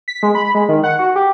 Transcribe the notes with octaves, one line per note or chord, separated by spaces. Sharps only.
B6
G#3
B5
G#3
D#3
F#5
F#4
G4